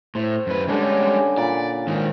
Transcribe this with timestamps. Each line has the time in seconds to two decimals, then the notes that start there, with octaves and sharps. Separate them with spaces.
0.15 A2 C5
0.47 F#2 B4
0.68 D3 G3 G#3 C#4
1.01 B4 G#5 C6
1.38 A#2 D5 B5
1.87 G#2 D#3 C5